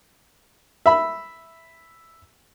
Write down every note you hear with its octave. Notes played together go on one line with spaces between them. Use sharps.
E5 B5